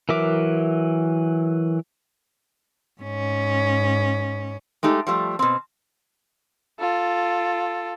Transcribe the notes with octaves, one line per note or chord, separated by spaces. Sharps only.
E3 F#3 A#4 E5 D6
G#2 C#4
G#3 A3 D#4 G4
F3 G3 A3
B2 C4
F4 A4